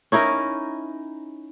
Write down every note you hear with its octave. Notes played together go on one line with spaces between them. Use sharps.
C#4 D#4 E4 A#4